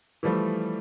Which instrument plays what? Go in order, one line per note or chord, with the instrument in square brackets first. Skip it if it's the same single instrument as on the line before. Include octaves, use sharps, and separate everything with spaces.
[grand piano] E3 F3 G3 A3